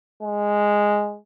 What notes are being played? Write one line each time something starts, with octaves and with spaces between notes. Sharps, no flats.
G#3